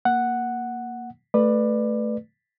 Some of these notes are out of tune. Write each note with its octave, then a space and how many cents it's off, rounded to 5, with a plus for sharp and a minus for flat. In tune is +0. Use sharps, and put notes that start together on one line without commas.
A#3 +0 F#5 +0
A3 +0 B4 +0 D5 +20